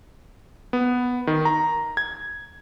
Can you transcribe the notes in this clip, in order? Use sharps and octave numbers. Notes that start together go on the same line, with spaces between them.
B3
D#3
A#5
G#6